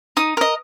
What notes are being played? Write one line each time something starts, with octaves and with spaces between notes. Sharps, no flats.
D#4 D#6
A#4 D#5